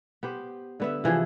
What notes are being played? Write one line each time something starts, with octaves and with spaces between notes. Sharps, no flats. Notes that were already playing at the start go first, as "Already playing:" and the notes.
B3 G4 C5
D3 B3 E5
C3 E3 F3 G#4